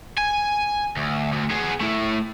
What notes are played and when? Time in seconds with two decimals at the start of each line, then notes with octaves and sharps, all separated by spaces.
0.18 G#5
0.97 D2
1.33 D2
1.51 B3 G#4
1.81 A3 E4